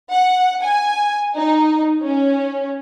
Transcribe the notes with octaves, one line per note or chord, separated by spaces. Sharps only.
F#5
G#5
D#4
C#4